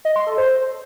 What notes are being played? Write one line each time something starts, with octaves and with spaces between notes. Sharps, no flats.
D#5
C6
A4
C5